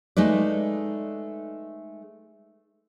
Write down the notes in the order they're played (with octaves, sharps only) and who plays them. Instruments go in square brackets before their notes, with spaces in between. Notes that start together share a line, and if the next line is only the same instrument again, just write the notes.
[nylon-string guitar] G#3 A3 D#4 B4 D5